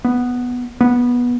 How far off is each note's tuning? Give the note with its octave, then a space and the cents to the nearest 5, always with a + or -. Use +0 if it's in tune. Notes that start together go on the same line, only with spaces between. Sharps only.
B3 +0
B3 -15